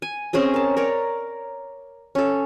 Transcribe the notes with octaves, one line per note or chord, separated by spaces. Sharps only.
G#5
C4 C#4 G#4 D#5
A#4 A5
A#4 C#5 D5
C#4 A4